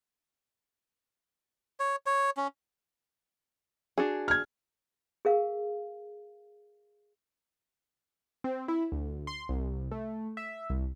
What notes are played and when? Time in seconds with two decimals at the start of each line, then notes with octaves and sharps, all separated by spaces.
1.80 C#5
2.06 C#5
2.37 C#4
3.98 D4 F#4 G#4
4.28 F6 G#6
5.25 G#4 A#4 F5
8.44 C4
8.68 E4
8.92 D2
9.27 C6
9.49 C2
9.91 A3
10.37 E5
10.70 C2